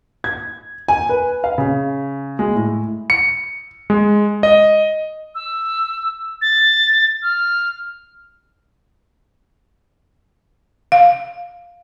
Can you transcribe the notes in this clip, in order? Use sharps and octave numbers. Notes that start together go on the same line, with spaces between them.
G#6
G#5
B4
F5
C#3
G#3
A2
C#7
G#3
D#5
E6
A6
F6
F5